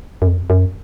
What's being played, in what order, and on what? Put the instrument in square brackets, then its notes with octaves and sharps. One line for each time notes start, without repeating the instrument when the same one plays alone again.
[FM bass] F#2
F2
F#2